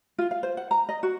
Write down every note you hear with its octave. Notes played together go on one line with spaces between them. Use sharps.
F4
F5
C5
F#5
A#5
D#5
F#4